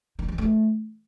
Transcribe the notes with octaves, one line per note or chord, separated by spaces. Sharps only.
D#3
E3
A3